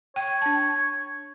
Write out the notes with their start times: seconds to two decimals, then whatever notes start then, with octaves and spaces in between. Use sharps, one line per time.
0.16 C#5 G5
0.42 D4 A5